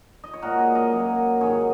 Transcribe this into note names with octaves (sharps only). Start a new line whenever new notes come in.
D#5
C#5
A#2 G#3 F#4 A#4
G#4 C#5
A#4 D#5
F#2 F#3 A#3
G#2 D#3 F#3 G#4 C#5